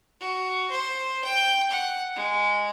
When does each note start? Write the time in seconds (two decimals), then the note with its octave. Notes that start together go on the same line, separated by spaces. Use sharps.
0.20 F#4
0.70 C5
1.25 G5
1.70 F#5
2.16 G#3